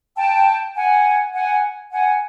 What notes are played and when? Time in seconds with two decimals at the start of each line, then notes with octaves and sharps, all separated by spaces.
0.17 G5 A5
0.75 F#5 G#5
1.34 F#5 G#5
1.92 F#5 G#5